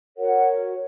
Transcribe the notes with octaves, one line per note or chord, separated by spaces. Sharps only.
F#4 A#4 C#5 F#5